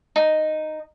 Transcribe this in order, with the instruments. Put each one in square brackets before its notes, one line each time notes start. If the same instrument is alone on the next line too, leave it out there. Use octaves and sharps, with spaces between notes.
[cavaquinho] D#4